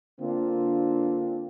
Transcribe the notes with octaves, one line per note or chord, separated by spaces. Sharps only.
D3 A#3 C4 D4 F4